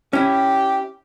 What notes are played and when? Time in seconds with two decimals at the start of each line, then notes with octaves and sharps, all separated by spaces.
0.13 C#4 E4 G4